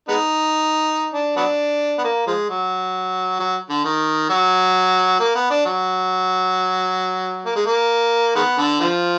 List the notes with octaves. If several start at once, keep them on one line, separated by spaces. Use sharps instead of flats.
G#3 B3 D#4
D4
F#3 B3 D4
B3
A#3
F3 G#3
F#3
F#3
D3
D#3
F#3
A#3
B3
D4
F#3
A#3
G#3
A#3
D#3 G#3 B3
D3
D3 F3